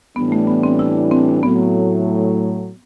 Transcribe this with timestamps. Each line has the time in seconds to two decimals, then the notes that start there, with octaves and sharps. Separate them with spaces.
0.16 A2 E3 G3 B3 D4
0.32 A3
0.47 B3
0.63 C4
0.79 E4
1.11 C4
1.43 A2 F#3 A3 B3